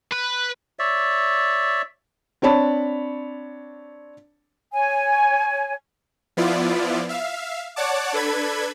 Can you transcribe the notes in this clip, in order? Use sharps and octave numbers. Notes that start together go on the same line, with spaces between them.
B4
C#5 D5 E5
C4 D4 C#5 A5 B5
C#5 G#5
F3 B3 E4 F4 D5
E5 F5
C#5 D5 F#5 A5 D6
D4 A4 B4 B5 G#6